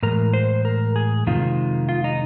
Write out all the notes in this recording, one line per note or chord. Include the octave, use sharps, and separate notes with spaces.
A2 E3 G#3 A#4
C5
A#4
G#4
F2 C3 D#3 G#3 F4
F4
D#4